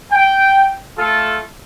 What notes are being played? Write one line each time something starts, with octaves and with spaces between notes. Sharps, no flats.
G5
A3 F4 A4